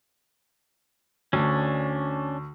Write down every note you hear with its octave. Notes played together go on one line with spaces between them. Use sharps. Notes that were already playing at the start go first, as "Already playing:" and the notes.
D2 C#4 D4